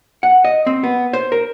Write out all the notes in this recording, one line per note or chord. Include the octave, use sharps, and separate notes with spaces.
F#5
D#5
C4
B3
C5
A#4